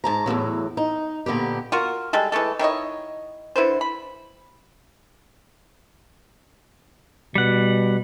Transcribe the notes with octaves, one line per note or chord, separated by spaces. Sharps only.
G#2 A5 A#5
E2 A2 C3 F#3
D#4
A#2 D3 B3 G4
F4 F#4 A#4
G3 G#3 A4
E3 G#3 A3 A4
D#3 E4 C#5 D#5
D3 E4 B4 C5
B5
B2 G3 F#5